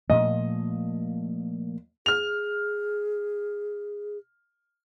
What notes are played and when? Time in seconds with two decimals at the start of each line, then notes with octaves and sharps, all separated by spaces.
0.10 A#2 F3 A3 D#5
2.06 G#4 F6 F7